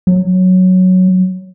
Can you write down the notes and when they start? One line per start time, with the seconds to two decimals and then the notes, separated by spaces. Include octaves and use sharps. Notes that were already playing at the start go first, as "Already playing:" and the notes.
0.07 F#3